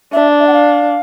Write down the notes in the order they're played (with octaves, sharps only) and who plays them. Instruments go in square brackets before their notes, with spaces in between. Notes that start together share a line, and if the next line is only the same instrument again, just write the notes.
[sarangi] D4 [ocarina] E5
[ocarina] E5
F#5
F5